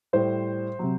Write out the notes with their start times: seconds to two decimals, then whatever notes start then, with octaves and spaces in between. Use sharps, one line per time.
0.13 A2 G3 C5
0.79 C3 F#3